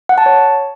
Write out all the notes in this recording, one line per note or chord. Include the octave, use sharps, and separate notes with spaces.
F#5
A5
C#5